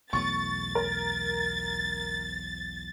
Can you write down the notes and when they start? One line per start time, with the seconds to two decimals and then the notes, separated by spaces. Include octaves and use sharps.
0.13 B1 E2 A3 C#6 A6
0.75 A#4